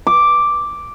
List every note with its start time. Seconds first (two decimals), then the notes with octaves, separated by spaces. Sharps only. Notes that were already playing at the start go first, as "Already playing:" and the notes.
0.07 D6